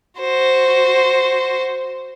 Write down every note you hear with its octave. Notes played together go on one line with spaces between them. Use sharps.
F#4 C5